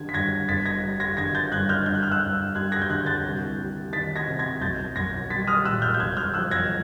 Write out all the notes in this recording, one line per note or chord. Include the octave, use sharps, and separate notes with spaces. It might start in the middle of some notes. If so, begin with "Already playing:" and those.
Already playing: D3 G3 G#6
B6
G2 G#6 A#6
G1 A6 B6
G#6 A#6
G3
G#6 A#6
D3 G#6 A#6
G6 A6
G2 F#6 G#6
F6 G6
G2 G6
F#6
F6
E6 F#6
G2
G3 F#6 G#6
G#6 A#6
G6
D3 F#6 G#6
G6 A6
C2
G3
D#3 A6 B6
G#6 A#6
C3
G#6 A#6
B1 G6 A6
B1 G#6 A#6
G3 A6 B6
D#6 F6
A#2 E6 F#6
F6 G6
G6
E1 F#6 G#6
F6 G6
F3 E6 F#6
G#6 A#6